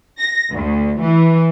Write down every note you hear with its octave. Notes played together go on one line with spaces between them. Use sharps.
A#6
D2
E3